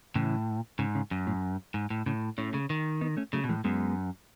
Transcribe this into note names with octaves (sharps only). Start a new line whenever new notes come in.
A2 C#3 E3
G#2 C#3
C#3
F#2
A2
G#2
A2
A2 C#3
A2 A3 C#4
C#3
D#3
B3 D#4
A3 C#4
C#3 F#3 A3
B2
A2 E3 G#3
F#2 G#3 B3